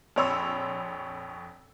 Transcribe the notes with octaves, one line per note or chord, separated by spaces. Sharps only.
A#1 F2 C#5 B5 C6 E6